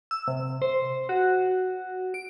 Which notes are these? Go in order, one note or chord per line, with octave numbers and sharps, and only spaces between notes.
E6
C3
C5
F#4
D7